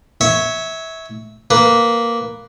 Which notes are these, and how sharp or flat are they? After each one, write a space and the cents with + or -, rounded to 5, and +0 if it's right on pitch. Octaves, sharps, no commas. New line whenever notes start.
C#5 +0 E5 -20
A#3 +0 B4 +0